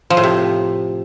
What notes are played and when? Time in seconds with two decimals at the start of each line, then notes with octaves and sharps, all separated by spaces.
0.10 F3
0.17 A2
0.23 C3